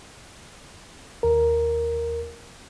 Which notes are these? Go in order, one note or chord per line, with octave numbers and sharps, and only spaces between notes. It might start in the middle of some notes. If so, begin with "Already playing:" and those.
D#2 A#4